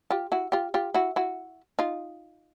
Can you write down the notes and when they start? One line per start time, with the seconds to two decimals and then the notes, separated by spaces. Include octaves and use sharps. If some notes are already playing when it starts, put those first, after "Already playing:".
0.10 F4 G4
0.32 E4 F#4
0.52 F4 G4
0.74 F4 G4
0.94 E4 F#4
1.16 E4 F#4
1.79 D#4 F4